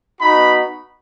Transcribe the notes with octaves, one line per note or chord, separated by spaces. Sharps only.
B3 D#4 F#4 B5